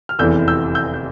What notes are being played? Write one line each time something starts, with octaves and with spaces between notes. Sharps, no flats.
F6
F1 E2 E3 E6 G6
E6 G6
E6 G6
G6